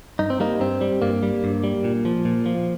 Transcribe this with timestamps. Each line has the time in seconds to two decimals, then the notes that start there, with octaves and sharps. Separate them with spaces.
0.19 G2 D#4
0.30 C4
0.40 G3 A#3 D#4
0.60 G2 C4
0.81 G3
1.02 G2 A#3
1.23 G3
1.44 G2
1.64 G3
1.84 A#2
2.05 F3
2.25 A#2
2.46 F3